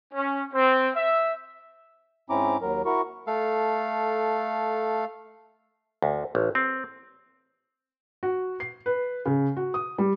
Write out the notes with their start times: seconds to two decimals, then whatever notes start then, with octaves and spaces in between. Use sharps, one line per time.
0.13 C#4
0.53 C4
0.94 E5
2.30 G#2 C4 C#4 E4 A#5 D6
2.62 D#2 F#3 A#4
2.85 E4 F#4 A#4 C#6
3.27 A3 A4 F5
6.02 D2
6.35 A1
6.55 C4
8.23 F#4
8.60 C7
8.86 B4
9.26 C#3
9.57 F#4
9.74 D#6
9.98 G3